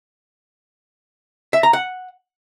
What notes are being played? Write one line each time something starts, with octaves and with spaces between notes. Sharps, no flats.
E5
A#5
F#5